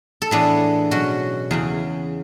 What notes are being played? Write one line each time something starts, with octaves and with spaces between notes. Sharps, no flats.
A4
A2 E3 B3 D4 G#4
B2 F#3 C#4 F#4
E2 C#3 E3 G#4